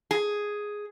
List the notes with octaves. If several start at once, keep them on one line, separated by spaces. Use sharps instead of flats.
G#4